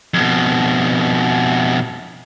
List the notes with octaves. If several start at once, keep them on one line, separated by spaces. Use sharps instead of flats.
F2 B2